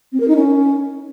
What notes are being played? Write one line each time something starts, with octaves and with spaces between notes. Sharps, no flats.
C4
A#4
D#4
C#4